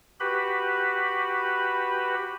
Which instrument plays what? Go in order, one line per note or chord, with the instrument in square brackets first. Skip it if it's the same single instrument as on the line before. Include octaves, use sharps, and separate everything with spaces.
[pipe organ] F#4 G4 B4 B5